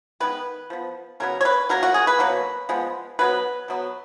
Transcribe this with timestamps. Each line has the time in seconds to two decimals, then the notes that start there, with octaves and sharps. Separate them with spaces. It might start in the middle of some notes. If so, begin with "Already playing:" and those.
0.20 D#3 G#3 B3 B4
0.70 F3 B3
1.20 C#3 F#3 B3 A#4
1.41 C#5
1.45 B4
1.69 B2 F#3 A#3 A#4
1.83 F#4
1.94 G#4
2.07 B4
2.19 B2 F#3 A#3
2.69 F3 G#3 B3
3.19 B2 F#3 B3 B4
3.68 B2 F#3 B3